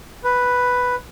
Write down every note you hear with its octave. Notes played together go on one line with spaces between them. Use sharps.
B4